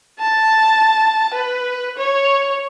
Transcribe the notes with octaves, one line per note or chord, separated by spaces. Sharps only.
A5
B4
C#5